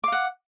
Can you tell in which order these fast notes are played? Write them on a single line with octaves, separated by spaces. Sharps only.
D6 F5 F#5